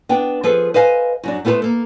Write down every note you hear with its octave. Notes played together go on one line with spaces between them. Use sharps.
B3 D4 G5
F3 G#4 A4 B4
B4 C5 D#5 F5 G#5
F#2 F#3 D4
A3 B3 F4 A4 B4 C5
A#3 A4